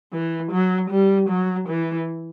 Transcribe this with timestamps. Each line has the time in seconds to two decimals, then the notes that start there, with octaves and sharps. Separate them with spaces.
0.13 E3
0.51 F#3
0.90 G3
1.29 F#3
1.68 E3